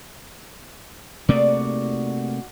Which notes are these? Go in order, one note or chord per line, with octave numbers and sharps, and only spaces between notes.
C3 A3 A#3 D#4 F#4 D5